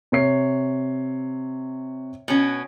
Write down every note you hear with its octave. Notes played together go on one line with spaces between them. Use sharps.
C3 C#5 C7
B2 C#4